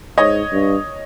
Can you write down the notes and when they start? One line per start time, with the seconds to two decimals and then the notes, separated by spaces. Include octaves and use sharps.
0.18 G#2 C#5 D#5
0.52 G2